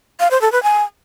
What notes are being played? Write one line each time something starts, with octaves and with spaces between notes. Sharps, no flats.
F5
C5
A4
B4
G#5